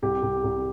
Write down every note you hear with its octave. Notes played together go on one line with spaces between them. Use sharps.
C2 G4
C2
C2